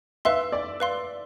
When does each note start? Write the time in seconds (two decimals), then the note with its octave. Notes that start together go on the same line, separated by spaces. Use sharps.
0.25 B4 E5 F5 C6
0.52 D5
0.80 B4 F5 C6